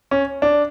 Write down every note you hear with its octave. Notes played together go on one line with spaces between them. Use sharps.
C#4
D4